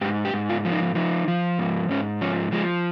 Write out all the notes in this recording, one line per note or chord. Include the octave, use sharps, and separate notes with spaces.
G#2 G4
G4
G#2
F4
F3
D#4
F3 D#4
F3
G#2
G#2 C#4
F3 C#4
F3 G#3